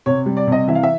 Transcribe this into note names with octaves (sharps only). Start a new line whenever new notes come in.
C3 C#5
G3
D5
C3 D#5
E3 E5
F5
E5